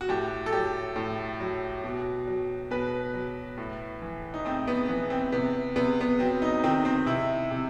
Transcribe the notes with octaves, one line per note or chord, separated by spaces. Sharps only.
F#4
A2 G4
A4
F#3 G4
A2
F#3
B2
F#3
B2 B4
F#3
A2
E3
D#4
A2 C4
B3
E3 B3
C4
C3 B3
C3 B3
B3
F#3 C4
D#4
D#3 C4
C4
C3 E4
C3